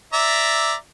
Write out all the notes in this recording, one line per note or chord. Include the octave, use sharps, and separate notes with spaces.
D5 E5 A#5